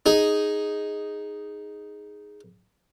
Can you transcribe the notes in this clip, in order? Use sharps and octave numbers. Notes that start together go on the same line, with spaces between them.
D#4 G#4